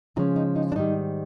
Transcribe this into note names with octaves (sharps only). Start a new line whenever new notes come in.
C#3 F3 G#3 C#4 D#4
D#4
D#4
D4
G#2 D#3 G3 D#4